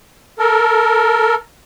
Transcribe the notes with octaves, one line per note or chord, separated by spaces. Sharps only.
A4 A#4